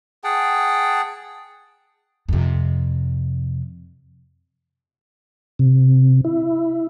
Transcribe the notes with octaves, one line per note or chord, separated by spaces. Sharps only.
G#4 F#5 G5 A5
F2 C3
C3
E4